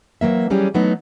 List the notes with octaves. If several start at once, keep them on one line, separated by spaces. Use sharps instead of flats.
E3 F#3 A#3 E5
E3 F#3 G3 C#4 G4 G#4
E3 F#3 A3 B3 D#4